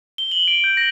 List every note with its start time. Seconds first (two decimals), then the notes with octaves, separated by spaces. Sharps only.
0.18 G7
0.31 F#7
0.48 D7
0.64 G6
0.77 A#6